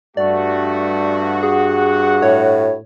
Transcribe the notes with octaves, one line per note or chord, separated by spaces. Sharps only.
G2 A3 F#4 D5
G#4 F#5
A2 C#5